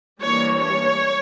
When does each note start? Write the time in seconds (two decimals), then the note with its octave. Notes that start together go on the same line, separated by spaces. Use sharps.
0.21 E3 G3 A#3 D4 C#5
0.59 C#5